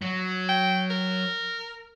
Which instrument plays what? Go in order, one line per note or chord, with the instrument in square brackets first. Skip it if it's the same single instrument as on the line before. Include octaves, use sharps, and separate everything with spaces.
[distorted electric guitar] F#3
[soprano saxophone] G5
A#4